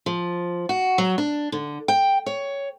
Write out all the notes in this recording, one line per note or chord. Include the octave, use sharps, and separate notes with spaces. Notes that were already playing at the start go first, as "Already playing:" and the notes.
F3
F#4
F#3
D4
D3
G5
C#5